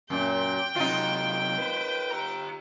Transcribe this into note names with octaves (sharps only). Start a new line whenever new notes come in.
F#2 A#2 G5
C3 F#3 D#4 F4
B4 C5
G4 A#5